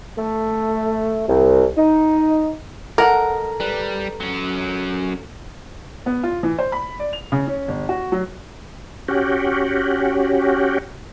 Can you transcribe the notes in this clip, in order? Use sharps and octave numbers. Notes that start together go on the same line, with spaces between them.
A3
C2
D#4
A4 A#4 D#5 F#5 A#5
G3 B4
F#3 C#4
B3
F4
E3
C5
B5
D5
F7
C#3
C#4
G1
F#4
F#3
C#4 F#4 G4